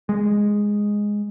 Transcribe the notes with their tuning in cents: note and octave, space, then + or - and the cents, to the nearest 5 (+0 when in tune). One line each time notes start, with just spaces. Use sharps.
G#3 -5